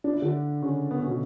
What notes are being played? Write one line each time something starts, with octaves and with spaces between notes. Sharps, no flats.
D4
E4
D3 D4
C#3 C#4
B3
C#4
B2 B3